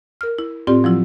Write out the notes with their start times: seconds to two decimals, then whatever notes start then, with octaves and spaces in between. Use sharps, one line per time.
0.21 A#4 F6
0.39 E4
0.67 A2 C4 F4 G4 D5 C6
0.84 F3 F#3 E4 F4